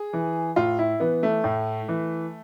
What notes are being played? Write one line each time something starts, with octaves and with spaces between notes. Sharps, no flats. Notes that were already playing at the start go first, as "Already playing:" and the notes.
Already playing: G#4
E3
A2 F4
E4
E3 B3
A3
A2
E3